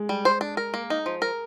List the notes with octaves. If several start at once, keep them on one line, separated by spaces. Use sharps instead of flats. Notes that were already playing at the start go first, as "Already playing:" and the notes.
Already playing: G#3
G3
C5
D4
A#4
A#3
D#4
F3
A#4